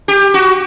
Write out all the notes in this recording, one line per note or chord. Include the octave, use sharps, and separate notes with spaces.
G4
F#4